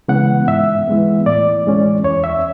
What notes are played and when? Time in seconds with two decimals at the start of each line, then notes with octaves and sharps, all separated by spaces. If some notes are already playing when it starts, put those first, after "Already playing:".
0.08 C#3 E3 G#3 B3 F#5
0.48 G#2 E5
0.88 E3 G#3 B3
1.26 A2 D5
1.66 E3 G#3 C#4
2.04 E2 C#5
2.24 E5